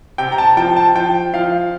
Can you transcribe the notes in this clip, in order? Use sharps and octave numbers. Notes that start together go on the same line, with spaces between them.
C3 G5
A#5
A5
F3 G5
A5
F3 G5
F3 F5